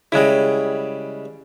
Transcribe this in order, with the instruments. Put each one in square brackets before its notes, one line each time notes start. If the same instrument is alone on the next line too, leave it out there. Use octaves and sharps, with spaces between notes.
[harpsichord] C#3 G3 [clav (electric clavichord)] G#3 E4